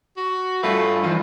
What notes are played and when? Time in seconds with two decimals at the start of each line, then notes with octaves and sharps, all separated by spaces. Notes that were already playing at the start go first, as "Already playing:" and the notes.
0.17 F#4
0.63 G2 A3 F4 B4
1.03 E3 F3 D#4 F4